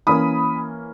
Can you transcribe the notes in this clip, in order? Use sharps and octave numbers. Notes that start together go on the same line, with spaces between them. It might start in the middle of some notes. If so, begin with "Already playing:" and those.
E3 A#3 C#4 B5 D#6